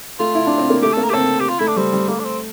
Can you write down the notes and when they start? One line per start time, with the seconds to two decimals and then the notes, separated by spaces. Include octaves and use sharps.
0.19 A3 F4
0.35 E4
0.47 D4
0.58 C4
0.70 A#3
0.82 A3 G4
0.93 A4
0.97 A#3
1.03 A#4
1.09 G4
1.13 C4 A4
1.40 G4
1.49 F4
1.59 A3 E4
1.68 D4
1.76 G3 C4
1.93 G3
2.08 A3 A#3
2.20 D4
2.25 C4